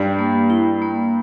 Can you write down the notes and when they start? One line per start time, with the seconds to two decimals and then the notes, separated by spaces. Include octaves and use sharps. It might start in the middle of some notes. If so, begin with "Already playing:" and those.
Already playing: G2 G3
0.19 A#3
0.50 E4
0.82 A#3